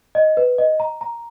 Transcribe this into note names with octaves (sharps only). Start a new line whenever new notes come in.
D#5
B4
D#5
A#5
A#5